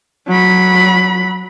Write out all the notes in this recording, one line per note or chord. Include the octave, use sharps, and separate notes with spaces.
F#3 B5